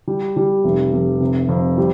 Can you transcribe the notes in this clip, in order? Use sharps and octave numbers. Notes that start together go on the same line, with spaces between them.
G3
G3
F1
F1
C3
F2
G3